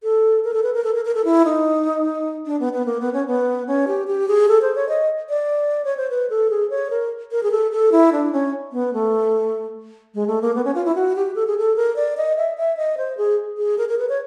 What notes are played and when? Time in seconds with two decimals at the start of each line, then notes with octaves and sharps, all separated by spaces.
0.03 A4
0.44 A#4
0.54 A4
0.63 B4
0.74 A#4
0.84 A4
0.94 A#4
1.05 A#4
1.15 A4
1.25 E4
1.45 D#4
2.46 D4
2.60 B3
2.73 B3
2.86 A#3
3.00 B3
3.13 C#4
3.27 B3
3.67 C#4
3.87 G4
4.07 G4
4.28 G#4
4.48 A4
4.62 C5
4.75 C#5
4.89 D#5
5.29 D5
5.85 C#5
5.97 C5
6.10 B4
6.30 A4
6.50 G#4
6.70 C#5
6.90 A#4
7.31 A#4
7.43 G#4
7.51 A4
7.72 A4
7.92 E4
8.12 D4
8.32 C#4
8.72 B3
8.94 A3
10.15 G#3
10.27 A3
10.42 A#3
10.55 B3
10.65 C#4
10.75 F4
10.85 E4
10.95 F#4
11.16 G4
11.35 A4
11.47 G#4
11.58 A4
11.76 A#4
11.96 D5
12.17 D#5
12.37 E5
12.57 E5
12.77 D#5
12.98 C5
13.17 G#4
13.57 G#4
13.78 A#4
13.89 A#4
13.99 B4
14.09 C#5